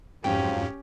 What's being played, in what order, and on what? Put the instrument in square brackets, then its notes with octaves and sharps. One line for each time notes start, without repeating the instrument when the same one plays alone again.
[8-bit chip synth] F2 G#2 [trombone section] F3 F#3 F4 [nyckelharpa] C#4 G4 [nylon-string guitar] G5